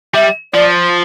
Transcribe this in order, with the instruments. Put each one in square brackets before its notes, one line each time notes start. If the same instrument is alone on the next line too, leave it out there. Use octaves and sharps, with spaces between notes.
[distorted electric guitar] G3 [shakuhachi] E5
[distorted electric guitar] F3 [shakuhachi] D5